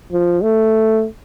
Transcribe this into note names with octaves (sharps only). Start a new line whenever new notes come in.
F3
A3